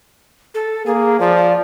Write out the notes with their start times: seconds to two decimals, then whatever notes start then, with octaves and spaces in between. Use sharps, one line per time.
0.54 A4
0.86 A#3 G#4
1.20 F3 D5